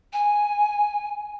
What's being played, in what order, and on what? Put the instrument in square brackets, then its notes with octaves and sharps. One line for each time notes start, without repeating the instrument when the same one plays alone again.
[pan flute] G#5